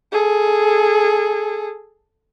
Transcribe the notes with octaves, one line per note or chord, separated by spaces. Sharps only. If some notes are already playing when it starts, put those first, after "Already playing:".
G#4 A4